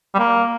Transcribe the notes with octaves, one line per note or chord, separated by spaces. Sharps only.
G3
A#3